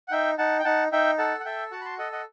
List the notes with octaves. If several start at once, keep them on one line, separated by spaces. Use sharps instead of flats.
F#5
D#4 E5 G5
D#4 F#5 A5
G5
D#4 F#5 A5
D#4 E5 G5
A4 F#5 A5
F#5
A4 E5 G5
F#4 F#5 A5
B5
A5 C6
A4 D#5 F#5
D#5 F#5